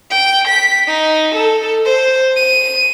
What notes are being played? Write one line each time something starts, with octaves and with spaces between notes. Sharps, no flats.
G5
B6
D#4
A4
C5
D#7